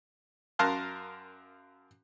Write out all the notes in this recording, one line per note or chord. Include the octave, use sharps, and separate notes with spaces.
F#2 A#4 F5 A5 C6 F#6